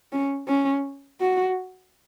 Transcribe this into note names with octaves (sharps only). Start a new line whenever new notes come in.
C#4
C#4
F#4